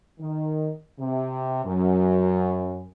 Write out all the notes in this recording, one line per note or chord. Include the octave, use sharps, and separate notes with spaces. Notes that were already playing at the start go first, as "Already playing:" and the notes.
D#3
C3
F#2